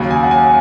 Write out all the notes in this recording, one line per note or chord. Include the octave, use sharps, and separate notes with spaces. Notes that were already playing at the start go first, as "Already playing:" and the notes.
Already playing: D#2 C#3 F#3
G#5
F#5
G#5